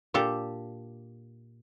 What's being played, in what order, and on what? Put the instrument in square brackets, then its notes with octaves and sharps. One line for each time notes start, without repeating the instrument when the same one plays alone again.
[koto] A#2 D4 G4 A4